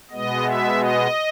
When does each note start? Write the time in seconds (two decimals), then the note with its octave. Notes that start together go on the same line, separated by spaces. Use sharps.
0.11 B2 G#3 B3 D#5
0.45 E5
0.79 D#5